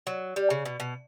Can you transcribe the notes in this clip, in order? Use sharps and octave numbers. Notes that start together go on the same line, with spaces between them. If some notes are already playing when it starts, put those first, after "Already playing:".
F#3
G3
C#3
B2
B2